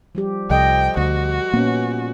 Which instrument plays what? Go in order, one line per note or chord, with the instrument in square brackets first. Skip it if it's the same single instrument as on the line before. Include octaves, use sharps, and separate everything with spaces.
[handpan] F3 G3 G4
[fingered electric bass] C2 [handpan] F3 A4 D#5 [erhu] G5
[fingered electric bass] D2 [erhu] F#4
[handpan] A#2 B3 C#4 [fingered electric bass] A#3